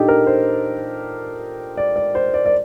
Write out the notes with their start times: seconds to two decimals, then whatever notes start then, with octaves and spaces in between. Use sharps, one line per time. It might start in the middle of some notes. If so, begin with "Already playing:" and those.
Already playing: A#2 D4 D#4 G4 A4
0.08 A#4
0.27 C5
1.77 D5
1.96 D5
2.15 C5
2.34 D5
2.46 D5